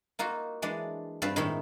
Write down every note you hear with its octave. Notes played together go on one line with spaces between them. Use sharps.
A#3 D#4 F4 F#4
E3 G#3 D4 D5
G2 C4 F4 B4 F5 A5
A2 D#3 G#3 A3 D#4 E4